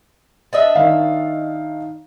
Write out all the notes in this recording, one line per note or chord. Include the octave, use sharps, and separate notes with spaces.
D4 D#5 E5
D#3 F5